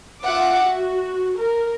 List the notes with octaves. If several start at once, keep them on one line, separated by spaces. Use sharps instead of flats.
F4 E5 F#5 D6
F#4
A#4